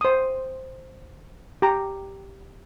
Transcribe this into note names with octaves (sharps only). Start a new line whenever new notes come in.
C5 D#6
G4 A#5